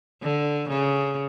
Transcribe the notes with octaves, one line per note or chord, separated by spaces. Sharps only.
D3
C#3